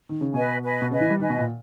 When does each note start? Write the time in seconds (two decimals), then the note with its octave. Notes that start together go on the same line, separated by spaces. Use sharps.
0.09 D#3
0.21 C#3
0.34 B2 B4 D#5 G#5
0.63 B4 D#5 G#5
0.82 B2
0.90 C#3 B4 D#5 G#5
1.01 E3
1.10 G3
1.20 D#3 B4 D#5 G#5
1.30 B2
1.38 A#2